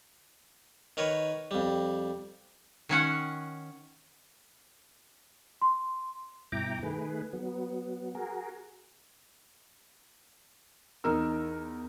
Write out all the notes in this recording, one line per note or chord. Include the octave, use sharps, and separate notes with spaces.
D#3 A#4 B4 C#5
F2 G3
D#3 C#4 F#5
C6
G2 B2 E4 G5 A#5 D6
D#3 A3 G#4 B4
F#3 B3
F#4 G#4 A#4
E2 D#4 A#4 E6